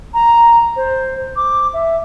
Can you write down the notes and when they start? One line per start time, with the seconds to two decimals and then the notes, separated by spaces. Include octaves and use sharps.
0.14 A#5
0.76 C5
1.36 D6
1.74 E5